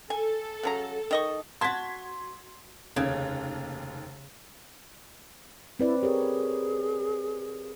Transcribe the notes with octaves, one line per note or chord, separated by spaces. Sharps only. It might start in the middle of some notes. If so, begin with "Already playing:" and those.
A4 G#5
C#3 F#3 A#5
D#3 D#5 C#6
F#4 A5 C6 G#6 B6
F1 D#2 C#3 G#6
C4 E4 B4 D5
G4 G#4 A#4 C#5